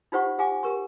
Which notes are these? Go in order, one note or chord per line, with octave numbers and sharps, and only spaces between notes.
D#4 F4 G4 C5 F#5 C#6
G4 F5 F#5 G#5 D6
G4 A#4 C#6